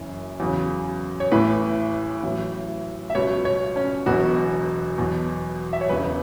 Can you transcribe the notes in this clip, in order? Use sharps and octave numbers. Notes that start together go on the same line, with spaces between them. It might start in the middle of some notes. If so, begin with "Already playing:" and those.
Already playing: F#1 F#2 E3
E2 C#3 F#3
C#5
A1 A2 E3 B4
A1 A2 F#3
E5
C#2 B2 F#3 C#5
C#5
C#4
E1 E2 B2 F#3 F#4
E2 B2 F#3
E5
C#5
E1 E2 C#3 B4